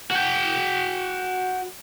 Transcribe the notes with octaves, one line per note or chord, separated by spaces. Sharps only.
F#4 G5